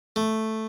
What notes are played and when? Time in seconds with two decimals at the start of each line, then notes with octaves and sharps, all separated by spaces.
0.16 A3